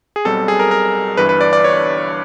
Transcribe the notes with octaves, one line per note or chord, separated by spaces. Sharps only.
G#4
B1 B2 G3 C4 A4
G#4
A#4
A#4
G1 G2 E3 B4
B4
D5
D5
C#5